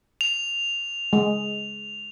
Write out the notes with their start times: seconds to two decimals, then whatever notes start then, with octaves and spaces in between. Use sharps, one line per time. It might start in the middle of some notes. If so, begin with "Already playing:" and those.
0.21 F7
1.13 G#3